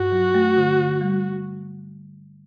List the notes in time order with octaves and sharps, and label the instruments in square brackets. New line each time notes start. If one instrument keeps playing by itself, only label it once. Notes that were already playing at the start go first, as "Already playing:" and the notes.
Already playing: [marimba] G2 [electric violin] F#4
[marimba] F#3
A3
D3
D3
G3